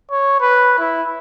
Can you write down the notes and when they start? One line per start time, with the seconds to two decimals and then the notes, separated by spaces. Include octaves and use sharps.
0.12 C#5
0.41 B4
0.79 E4